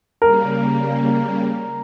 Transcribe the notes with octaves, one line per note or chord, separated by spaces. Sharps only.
C#3 G3 A#3 A#4